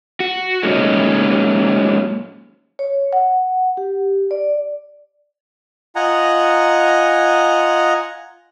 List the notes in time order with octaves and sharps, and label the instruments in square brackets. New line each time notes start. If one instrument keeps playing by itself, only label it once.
[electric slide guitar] F#4
F#3 G#3 A#3 C#4 D#4
[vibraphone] C#5
F#5
G4
D5
[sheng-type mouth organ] F4 D#5 F#5 G#5 A#5